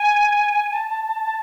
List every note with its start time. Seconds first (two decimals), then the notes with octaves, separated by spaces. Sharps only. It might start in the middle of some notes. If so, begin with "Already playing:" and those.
Already playing: G#5
0.73 A5